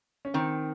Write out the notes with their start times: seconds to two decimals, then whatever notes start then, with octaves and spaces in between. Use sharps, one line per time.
0.25 C#4
0.34 D#3 C4